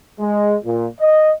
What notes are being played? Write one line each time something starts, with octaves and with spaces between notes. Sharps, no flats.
G#3
A#2
D#5